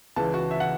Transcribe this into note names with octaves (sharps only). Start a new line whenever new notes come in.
C#2 C#3 E3 A5
F#4
E5
F#5